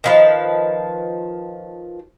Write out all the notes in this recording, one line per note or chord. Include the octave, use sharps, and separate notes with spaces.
D#3 F3 B4